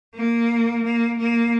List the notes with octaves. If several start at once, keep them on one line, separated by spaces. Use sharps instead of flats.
A#3
A#3
A#3